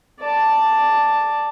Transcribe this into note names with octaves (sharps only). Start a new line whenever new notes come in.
D5 A5